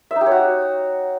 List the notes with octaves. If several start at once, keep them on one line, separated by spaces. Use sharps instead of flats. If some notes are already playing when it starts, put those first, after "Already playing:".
E5
D#4
G4
C#5
F#4